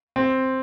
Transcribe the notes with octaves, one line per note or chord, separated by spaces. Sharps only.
C4